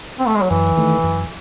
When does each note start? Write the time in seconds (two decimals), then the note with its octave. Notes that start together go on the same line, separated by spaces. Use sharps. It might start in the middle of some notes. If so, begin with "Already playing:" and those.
0.20 C4
0.27 A3
0.35 G#3
0.42 F#3
0.50 F#2 E3
0.77 D#3 A3
1.03 F#2